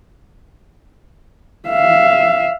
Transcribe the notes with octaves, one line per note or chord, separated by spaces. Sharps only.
E5 F5